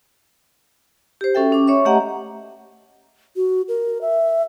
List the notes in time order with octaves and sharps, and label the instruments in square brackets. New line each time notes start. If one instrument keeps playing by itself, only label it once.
[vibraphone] G4 C5
C#4 F#4 A4 E5 G5
C#4 D6
C#5 E5 C#6
A3 G4 D#5 E5 F#5 A#5
[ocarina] F#4
A#4
E5